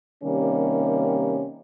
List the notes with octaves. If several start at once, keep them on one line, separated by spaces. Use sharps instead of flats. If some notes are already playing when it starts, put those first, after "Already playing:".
C3 D#3 G3 A#3 C#4